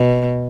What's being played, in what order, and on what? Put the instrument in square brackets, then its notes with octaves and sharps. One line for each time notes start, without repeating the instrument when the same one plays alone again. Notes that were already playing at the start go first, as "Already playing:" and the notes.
Already playing: [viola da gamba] B2